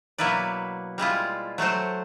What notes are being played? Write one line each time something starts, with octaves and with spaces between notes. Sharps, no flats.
B2 F#3 A#3 E4 B4 D5
G3 G#3 E4 F4
F#3 A3 F#4 C5